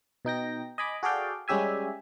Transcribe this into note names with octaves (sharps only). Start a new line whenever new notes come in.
B2 D#4 G5 A#6
D#5 G#5 B5 D6
F#4 G#4 A4 D5 F5 G5
G3 G#3 C#4 G4 E5 G#5